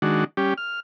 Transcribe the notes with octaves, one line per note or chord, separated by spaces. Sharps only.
D#3 G#3 D4 F#4
G3 C#4 G4
F6